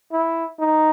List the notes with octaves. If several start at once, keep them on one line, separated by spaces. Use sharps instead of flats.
E4
D#4